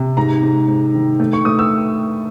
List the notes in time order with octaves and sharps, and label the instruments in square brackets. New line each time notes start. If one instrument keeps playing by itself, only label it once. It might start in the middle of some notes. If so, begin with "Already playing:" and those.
Already playing: [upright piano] C3
G#2 A#5
G#2
G#2
D#3
A3
C#6
A3 D#6
E6